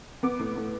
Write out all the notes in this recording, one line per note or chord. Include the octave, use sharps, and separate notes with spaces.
B3 D6
A2
A2